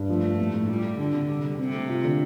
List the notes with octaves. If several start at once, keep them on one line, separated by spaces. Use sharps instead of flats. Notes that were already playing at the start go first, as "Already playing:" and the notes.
Already playing: G2
F3 A3
F3
A2
A2
G3 F4
F4
D3 D4
C3
G3
G3
C3 C4
A3
F4
D3